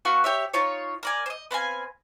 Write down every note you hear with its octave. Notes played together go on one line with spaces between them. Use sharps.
B3 F#4 F5 C#6
G4 C#5 E5
D#4 F4 C#5
A#4 D5 G#5
C5 D#5
B3 C4 F5 G#5